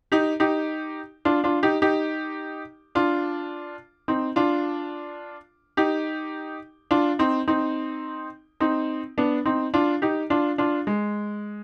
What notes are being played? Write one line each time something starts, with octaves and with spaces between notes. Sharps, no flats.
D#4 G4
D#4 G4
D4 F4
D4 F4
D#4 G4
D#4 G4
D4 F4
C4 D#4
D4 F4
D#4 G4
D4 F4
C4 D#4
C4 D#4
C4 D#4
B3 D4
C4 D#4
D4 F4
D#4 G4
D4 F4
D4 F4
G#3